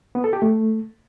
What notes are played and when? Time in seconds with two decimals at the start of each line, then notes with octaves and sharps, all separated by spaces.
0.15 B3
0.24 A4
0.33 G4
0.42 A3